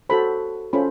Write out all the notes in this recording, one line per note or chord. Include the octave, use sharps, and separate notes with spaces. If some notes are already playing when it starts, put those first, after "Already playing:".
F#4 A4 C5 B5
C#4 F4 A4 C5 B5